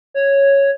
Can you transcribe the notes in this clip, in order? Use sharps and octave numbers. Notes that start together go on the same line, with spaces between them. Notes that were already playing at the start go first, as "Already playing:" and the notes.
C#5